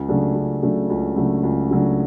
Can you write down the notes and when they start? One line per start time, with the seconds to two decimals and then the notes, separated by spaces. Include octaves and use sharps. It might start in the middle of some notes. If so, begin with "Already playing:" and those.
Already playing: C#2
0.09 C#3 F#3 A3 D4
0.35 C#2
0.63 C#3 F#3 A3 D4
0.90 C#2
1.16 C#3 F#3 A3 D4
1.43 C#2
1.71 C#3 F#3 A3 D4